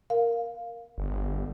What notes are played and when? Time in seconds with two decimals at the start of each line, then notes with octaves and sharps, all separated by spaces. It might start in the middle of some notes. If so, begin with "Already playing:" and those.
0.10 A#4 F5
0.98 G1